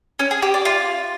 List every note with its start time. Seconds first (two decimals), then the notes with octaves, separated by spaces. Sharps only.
0.19 C#4
0.31 G#4
0.42 G4
0.54 D5
0.65 F4